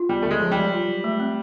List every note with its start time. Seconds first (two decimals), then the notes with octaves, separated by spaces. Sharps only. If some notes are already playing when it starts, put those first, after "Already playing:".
Already playing: F4
0.09 G3 B3
0.23 A3
0.25 D3
0.31 G#3
0.40 F3
0.52 G3
0.57 G#3
0.73 F4
0.88 F#3
1.04 A3
1.20 C4